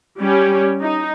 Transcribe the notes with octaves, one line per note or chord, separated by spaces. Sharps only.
G3 C#4 G4
D#4